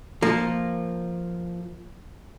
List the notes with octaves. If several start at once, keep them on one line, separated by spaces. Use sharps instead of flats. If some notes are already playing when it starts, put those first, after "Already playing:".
F3 A#3